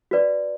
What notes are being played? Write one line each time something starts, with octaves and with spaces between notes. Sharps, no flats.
F#4 B4 D5